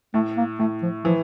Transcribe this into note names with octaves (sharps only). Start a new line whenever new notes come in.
A2 A3
A#3
A2 A3
F3
E3 F3